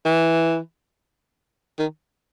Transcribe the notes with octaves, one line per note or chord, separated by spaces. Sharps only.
E3
D#3